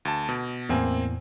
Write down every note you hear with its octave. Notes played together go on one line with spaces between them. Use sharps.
D2 A5
B2
E2 A2 A#3 C4 G#5